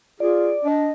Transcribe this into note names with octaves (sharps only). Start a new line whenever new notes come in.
F4 G#4 D5
D4 D#5